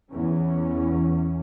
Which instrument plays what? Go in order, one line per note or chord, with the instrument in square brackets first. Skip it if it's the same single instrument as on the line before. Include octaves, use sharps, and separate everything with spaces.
[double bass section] E2 C#4